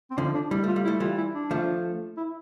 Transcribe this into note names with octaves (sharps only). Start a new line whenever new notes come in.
C4
D3 F3 D4
D4
G3 E4
A3 F4
G3
E4
A3
E3 G3 F4
E4
D4
F3 A3
E4